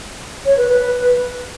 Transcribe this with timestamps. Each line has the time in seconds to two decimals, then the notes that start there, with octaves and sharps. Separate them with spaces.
0.45 C#5
0.57 B4
0.69 B4